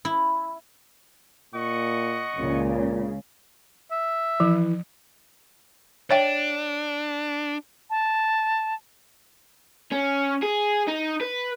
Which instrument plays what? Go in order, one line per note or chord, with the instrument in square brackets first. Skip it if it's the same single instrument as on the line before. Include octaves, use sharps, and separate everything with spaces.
[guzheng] E4
[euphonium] A#2 [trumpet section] D#5 F#5 C#6
[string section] C#2 C#3 [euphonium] A#2
[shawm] E5
[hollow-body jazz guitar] E3 [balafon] F3
[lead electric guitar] D4 [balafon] C#5 E5 G5
[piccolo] A5
[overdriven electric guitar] C#4
G#4
D#4
B4